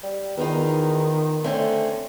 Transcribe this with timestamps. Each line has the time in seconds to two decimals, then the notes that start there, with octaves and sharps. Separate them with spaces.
0.03 G3
0.37 E2 D#3 B3 D#4 F4
1.44 D3 A3 C4 C#4